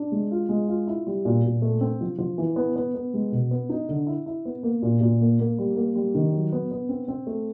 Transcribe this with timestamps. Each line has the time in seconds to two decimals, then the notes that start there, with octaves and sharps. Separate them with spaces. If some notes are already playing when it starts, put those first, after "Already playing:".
Already playing: D4
0.12 G#3
0.31 F4
0.49 G#3
0.68 F4
0.87 E4
1.07 G3
1.25 A#2
1.44 A#2
1.62 A3
1.81 C4
2.01 F3
2.18 F3
2.38 E3
2.56 B3
2.76 B3
2.94 B3
3.14 G#3
3.32 B2
3.51 B3
3.69 D#4
3.89 D3
4.07 E4
4.26 E4
4.45 B3
4.63 A#3
4.82 A#2
5.01 A#2
5.21 A#3
5.39 A#3
5.58 G3
5.76 A#3
5.95 G3
6.14 D#3
6.33 F#3
6.52 B3
6.71 B3
6.89 C4
7.08 C4
7.27 A3